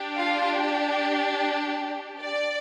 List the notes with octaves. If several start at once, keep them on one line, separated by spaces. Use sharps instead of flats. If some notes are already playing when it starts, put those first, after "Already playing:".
Already playing: D4 G4
F4 F5
D5